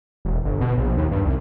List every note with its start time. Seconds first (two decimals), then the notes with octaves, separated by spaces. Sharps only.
0.25 E1
0.45 G1
0.61 B2
0.78 A#1
0.97 D#2
1.11 G2
1.25 C2